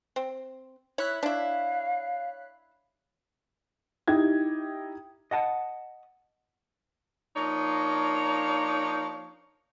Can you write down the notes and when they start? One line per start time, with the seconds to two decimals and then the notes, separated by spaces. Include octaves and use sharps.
0.16 C4
0.98 E4 C#5 F#6 B6
1.23 D4 E4 F5
4.08 D#4 E4 G4 G#6
5.31 D#5 F#5 A5
7.35 F3 A#3 D4 D#4 C#5